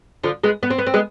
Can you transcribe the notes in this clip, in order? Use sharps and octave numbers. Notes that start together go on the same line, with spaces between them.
D3 F3
G#3 B3
B3
C4
B3
C4
G#3 B3